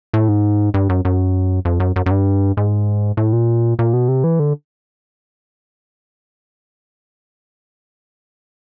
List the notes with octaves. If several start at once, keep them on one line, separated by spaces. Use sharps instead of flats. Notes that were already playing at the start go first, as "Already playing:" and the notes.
A2
G#2
G2
F#2
F#2
F2
F#2
F#2
F#2
G2
G#2
A2
A#2
A#2
B2
C3
E3
D3